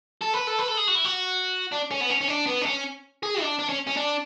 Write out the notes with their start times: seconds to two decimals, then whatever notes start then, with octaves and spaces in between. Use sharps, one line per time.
0.21 A4
0.33 B4
0.47 A4
0.59 B4
0.68 A4
0.77 G#4
0.88 F#4
0.95 E4
1.05 F#4
1.72 D4
1.91 C#4
2.01 B3
2.10 C#4
2.21 C#4
2.28 D4
2.46 B3
2.61 D4
2.66 C#4
3.23 G#4
3.41 D4
3.59 D4
3.69 C#4
3.87 C#4
3.97 D4